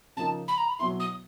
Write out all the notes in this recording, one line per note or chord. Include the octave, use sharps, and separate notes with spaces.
C#3 F3 A#3 D#4 A5
B5
A#5
B5
B2 F#3 B3 E4 C6
D#6